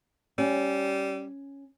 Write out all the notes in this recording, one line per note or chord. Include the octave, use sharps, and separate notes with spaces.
G3 C#4